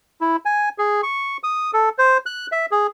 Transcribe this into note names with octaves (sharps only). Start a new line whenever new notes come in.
E4
G#5
G#4
C#6
D#6
A4
C5
F#6
E5
G#4